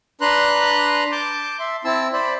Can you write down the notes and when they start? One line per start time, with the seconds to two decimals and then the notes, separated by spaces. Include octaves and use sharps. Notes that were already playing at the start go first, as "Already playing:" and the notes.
0.21 D4 B4 A#5 C6 F#6
1.12 A5 D6 G6
1.59 E5 C6
1.85 C4 E4 A5 E6
2.13 C5 D5 B5